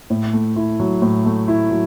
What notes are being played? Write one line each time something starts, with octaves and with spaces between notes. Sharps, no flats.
A2
A3
E4
F#3
A2
A3
E4
F#3